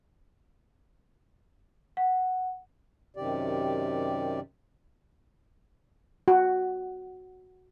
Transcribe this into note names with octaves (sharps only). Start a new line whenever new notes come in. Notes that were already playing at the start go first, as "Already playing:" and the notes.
F#5
F#2 C3 D#3 G4 D5
F#4